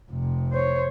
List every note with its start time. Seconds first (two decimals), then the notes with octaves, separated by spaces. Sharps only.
0.11 F1 C3
0.52 C5 C#5